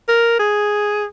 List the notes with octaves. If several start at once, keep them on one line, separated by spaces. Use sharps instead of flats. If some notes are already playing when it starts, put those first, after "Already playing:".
A#4
G#4